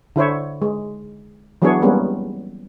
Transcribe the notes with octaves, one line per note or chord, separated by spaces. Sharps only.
D3 E4 C5 C#5
G#3
E3 F#3 B3 D4 G#4 C#5
G3 G#3 A#3 B3 C#4